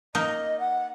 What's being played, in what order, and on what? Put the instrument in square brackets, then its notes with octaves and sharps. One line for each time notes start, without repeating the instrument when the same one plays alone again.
[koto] A#3 D#4 [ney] D#5
[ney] F#5